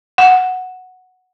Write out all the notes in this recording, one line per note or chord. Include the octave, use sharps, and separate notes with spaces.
F#5